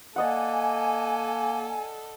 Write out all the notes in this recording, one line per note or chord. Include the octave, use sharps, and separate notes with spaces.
A#3 A4 D5 D#5 F#5 G#5